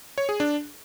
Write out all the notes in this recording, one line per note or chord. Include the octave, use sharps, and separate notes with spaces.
C#5
G#4
D4